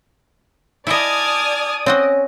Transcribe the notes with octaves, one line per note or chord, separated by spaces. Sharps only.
E4 D5 D#5 G#5 A5 D#6 F6
C4 C#4 F#4 D#5